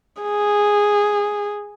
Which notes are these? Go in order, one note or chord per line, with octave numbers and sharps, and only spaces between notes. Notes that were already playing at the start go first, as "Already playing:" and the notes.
G#4